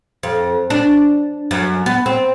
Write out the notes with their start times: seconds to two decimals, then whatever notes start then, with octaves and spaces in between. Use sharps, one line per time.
0.23 F2
0.70 D4
1.51 F#2
1.86 B3
2.06 C4